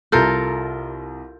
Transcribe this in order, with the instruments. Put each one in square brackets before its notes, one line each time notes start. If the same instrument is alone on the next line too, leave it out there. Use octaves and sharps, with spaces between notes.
[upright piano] C2 A#5 G6 [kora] F4 A4 A#4